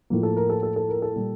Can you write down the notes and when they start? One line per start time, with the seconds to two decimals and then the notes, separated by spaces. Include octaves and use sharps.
0.10 A2 F3 A#3
0.23 A4
0.37 A#4
0.50 A4
0.63 A4
0.76 A4
0.89 A#4
1.02 A4
1.16 A#2 G3